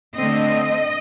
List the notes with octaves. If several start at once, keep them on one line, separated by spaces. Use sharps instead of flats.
D3 A3 C4 D#5